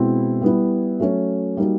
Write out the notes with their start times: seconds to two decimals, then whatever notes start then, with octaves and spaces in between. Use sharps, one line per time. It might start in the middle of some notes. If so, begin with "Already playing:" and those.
Already playing: B2 G#3 C4 E4
0.41 G3 B3 E4
1.00 F#3 A3 C#4
1.57 G3 A#3 D#4 F#4